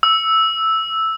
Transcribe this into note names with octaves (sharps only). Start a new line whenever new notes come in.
E6